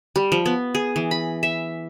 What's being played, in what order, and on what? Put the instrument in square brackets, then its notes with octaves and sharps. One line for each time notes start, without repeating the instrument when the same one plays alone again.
[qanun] G3
F3
B3
G#4
E3
B5
E5